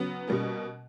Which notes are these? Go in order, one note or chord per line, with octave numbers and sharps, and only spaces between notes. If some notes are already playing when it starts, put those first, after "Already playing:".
Already playing: C#3 F#3 B3
B2 G3 A#3 C#4